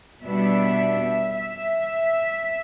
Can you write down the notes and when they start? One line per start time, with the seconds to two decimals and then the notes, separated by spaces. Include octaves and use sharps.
0.24 B2 G3 B3 D4 E5
1.36 E5